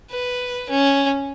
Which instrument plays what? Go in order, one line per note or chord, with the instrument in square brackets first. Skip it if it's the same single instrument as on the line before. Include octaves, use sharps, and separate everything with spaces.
[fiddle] B4
C#4